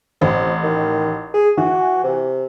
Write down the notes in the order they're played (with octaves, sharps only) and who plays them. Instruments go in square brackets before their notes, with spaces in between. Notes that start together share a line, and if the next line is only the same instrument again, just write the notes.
[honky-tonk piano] A1 [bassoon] C4
[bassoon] D#3
G#4
[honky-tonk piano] E3 [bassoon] F#4
[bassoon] C3